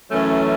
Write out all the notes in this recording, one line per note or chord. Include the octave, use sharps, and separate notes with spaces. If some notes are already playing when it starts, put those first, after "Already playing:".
F#2 E3 A3 C#4